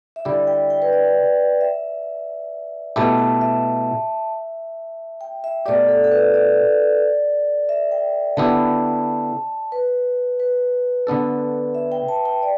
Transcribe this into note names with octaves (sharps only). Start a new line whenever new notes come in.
E5
D3 G3 E4 G4 D5
G5
G5
B4
D5
E5
B2 A3 E4 G4 A5
A5
E5
G5
E5
B2 A3 G4 D5
A4
A4
B4
D5
E5
G5
D3 B3 E4 G4 A5
B4
B4
D3 B3 D4 A4
E5
G5
A5
G5
D5